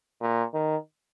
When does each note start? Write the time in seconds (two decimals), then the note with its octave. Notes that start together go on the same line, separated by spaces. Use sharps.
0.21 A#2
0.53 D#3